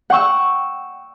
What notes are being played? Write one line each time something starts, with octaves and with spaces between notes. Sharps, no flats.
F#5 G5 C#6 E6